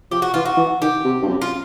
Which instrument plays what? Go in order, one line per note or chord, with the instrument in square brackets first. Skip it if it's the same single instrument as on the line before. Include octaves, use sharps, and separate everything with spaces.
[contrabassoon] F3 [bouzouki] G4
[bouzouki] F#4
[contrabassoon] E3 [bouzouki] F4
[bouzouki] F#4
[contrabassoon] E3
[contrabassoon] D#3 [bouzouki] G4
[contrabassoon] C3
G2
F#2
[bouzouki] F4